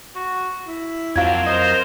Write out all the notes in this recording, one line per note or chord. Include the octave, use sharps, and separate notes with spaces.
F#4
E4
F2 F#3 A#3 C4 D4 F5 G#6
A#4 C5 D#5